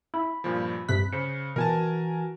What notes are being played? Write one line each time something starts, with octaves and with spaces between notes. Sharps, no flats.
E4 B5
G2 A#2 F3
G2 C3 F#6 B6
C#3 C5 C#7
B2 E3 F#4 A#4 G#5 A5